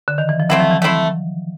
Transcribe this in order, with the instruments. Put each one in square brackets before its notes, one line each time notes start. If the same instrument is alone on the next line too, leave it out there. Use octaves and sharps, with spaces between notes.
[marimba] D3
D#3
E3
F3
[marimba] F#3 [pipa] A3 C4 E4
[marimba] F3
E3
[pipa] A3 C4 E4